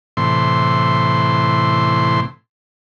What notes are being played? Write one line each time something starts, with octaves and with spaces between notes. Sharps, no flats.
A2 C3 E3 C6